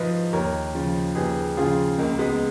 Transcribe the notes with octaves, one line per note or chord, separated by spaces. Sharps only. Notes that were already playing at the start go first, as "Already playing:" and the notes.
Already playing: G#2 F3 B4 D#5
D#2 A#4 C#5
C#3 F3
D#2 G#4 B4
C#3 F3 F4 G#4
C#2 A#3
G#3 B3